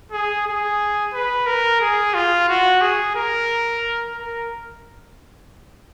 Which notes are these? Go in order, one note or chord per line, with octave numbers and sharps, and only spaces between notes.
G#4
G#4
B4
A#4
G#4
F4
F#4
G#4
A#4
A#4